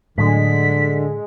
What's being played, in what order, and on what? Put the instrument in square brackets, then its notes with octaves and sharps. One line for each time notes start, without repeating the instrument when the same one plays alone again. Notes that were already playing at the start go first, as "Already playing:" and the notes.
[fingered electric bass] A2 F#3 [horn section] D3 [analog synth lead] G#3 [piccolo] B6